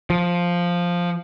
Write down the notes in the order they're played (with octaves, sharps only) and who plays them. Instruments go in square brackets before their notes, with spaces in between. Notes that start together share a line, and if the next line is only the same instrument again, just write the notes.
[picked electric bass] F3